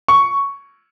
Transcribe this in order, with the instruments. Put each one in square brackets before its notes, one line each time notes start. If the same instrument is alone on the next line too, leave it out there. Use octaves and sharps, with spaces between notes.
[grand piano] C#6